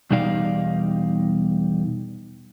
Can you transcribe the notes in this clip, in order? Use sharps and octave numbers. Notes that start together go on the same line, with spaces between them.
E2 B2 G3 D#4 D5 F5